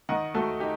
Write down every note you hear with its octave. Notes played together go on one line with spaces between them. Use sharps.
D#3 D#5 F#5
A3 F#4 A4
D#4 G4